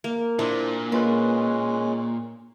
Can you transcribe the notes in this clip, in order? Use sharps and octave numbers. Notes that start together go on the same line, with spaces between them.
A#3
A#2 D4 E4 C5 E5
G#3 A#3 C#4 F4 B4 F#6